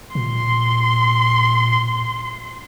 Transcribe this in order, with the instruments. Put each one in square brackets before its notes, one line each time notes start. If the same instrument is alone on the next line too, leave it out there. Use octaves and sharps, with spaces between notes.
[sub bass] A#2 [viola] C6